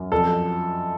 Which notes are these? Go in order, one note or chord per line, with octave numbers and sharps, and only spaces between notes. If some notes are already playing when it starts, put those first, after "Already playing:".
Already playing: F#2
F2 A4